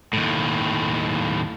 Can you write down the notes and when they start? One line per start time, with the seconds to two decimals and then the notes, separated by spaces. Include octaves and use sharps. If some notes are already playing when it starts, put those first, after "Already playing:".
0.13 D#2 A2